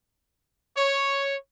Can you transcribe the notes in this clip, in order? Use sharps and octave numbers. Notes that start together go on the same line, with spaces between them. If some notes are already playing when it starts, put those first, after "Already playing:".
C#5